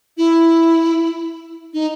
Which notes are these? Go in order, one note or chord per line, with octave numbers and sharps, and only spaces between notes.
E4
D#4